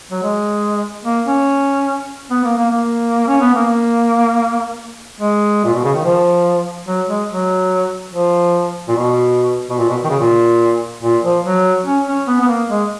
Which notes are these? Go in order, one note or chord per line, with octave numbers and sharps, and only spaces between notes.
F#3
G#3
A#3
C#4
B3
A#3
A#3
A#3
C#4
B3
A#3
G#3
A#2
B2
C#3
D#3
F3
F#3
G#3
F#3
F3
A#2
B2
B2
A#2
B2
D#3
C#3
A#2
A#2
F3
F#3
C#4
C#4
B3
B3
A#3
G#3